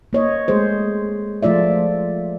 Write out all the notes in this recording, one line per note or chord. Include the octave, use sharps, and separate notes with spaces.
A#3 C#5 D#5
G#3 A3 G#4 C5
F3 A3 F4 D5 E5